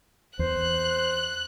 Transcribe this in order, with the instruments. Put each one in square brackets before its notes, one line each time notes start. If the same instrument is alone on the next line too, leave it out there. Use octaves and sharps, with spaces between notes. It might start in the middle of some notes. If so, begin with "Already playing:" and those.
[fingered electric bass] E2 [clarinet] C5 [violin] F#6